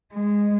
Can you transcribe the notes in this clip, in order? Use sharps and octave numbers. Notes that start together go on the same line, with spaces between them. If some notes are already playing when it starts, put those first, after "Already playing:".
G#3